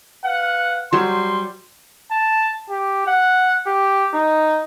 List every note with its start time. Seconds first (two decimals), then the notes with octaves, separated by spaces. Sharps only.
0.24 B4 F5 F#5
0.93 F#3 G3 C5 C6
2.11 A5
2.70 G4
3.07 F#5
3.67 G4
4.14 D#4